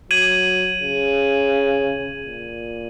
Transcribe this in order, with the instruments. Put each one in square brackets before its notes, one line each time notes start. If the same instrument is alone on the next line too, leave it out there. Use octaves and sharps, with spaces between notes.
[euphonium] F#3 [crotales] G#6 D#7 F#7
[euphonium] C#3
A#2